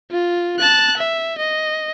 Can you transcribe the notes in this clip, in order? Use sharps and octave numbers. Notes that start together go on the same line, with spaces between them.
F4
A5 F#6
E5
D#5